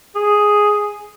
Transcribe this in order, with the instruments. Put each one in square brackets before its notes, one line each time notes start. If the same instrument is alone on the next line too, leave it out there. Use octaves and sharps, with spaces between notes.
[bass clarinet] G#4